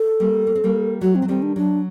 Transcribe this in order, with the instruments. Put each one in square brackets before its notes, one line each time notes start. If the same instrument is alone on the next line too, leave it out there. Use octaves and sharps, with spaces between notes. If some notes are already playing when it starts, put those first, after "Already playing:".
Already playing: [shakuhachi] A4
[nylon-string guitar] G3 A#3
A#3
C4
G3 A#3
[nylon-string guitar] F#3 A3 [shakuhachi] F#4
[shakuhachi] C4
[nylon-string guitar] F#3
[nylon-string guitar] D#3 G3 [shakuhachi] C4
[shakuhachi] D4
[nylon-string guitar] F#3 [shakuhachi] D4